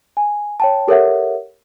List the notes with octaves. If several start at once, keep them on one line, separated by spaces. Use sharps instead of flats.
G#5
C#5 G5 A5
G4 A4 A#4 C#5 E5 F#5